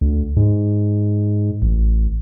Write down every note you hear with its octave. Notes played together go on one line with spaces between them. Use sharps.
D2
G#2
A1